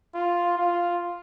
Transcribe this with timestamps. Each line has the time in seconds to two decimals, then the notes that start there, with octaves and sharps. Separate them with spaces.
0.15 F4
0.58 F4